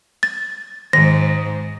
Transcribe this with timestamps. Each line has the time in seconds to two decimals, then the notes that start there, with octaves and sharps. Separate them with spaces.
0.23 A6
0.93 G#2 D#3 A#6